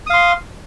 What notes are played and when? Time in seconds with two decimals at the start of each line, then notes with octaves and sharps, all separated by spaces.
0.06 D#6
0.10 F5
0.14 C6